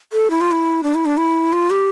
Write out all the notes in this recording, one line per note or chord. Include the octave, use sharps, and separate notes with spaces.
A4
E4
F4
E4
D4
E4
D4
E4
F4
G4